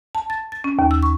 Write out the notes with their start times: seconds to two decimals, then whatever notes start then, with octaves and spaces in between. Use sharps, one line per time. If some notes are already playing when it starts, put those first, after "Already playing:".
0.15 A5
0.30 A6
0.52 A6
0.64 C#4
0.79 D#2
0.91 E6
1.03 C#6